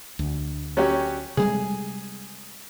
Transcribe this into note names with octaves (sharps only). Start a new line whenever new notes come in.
D2
F#3 C#4 G4
C3 G3 G#3 G#4